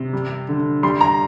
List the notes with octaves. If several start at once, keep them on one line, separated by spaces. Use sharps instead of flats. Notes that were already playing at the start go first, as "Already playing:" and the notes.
Already playing: C3
G3
D3
G3 C6
A#5